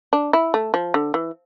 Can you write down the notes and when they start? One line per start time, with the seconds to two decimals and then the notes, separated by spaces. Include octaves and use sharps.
0.13 D4
0.33 E4
0.54 A3
0.74 F3
0.94 D3
1.14 E3